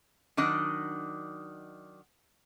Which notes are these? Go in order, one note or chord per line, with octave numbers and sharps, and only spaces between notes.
D#3 F#3 D4 D#5